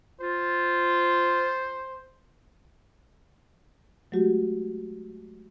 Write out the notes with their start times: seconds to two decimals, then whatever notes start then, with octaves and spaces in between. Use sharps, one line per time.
0.20 F4 C5
4.12 F#3 G#3 A3 F#4 G4